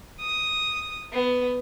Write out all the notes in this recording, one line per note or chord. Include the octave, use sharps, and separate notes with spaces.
D#6
B3